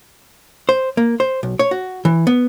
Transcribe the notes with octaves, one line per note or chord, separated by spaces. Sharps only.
C5
A#3
C5
B1
C#5
F#4
E3
B3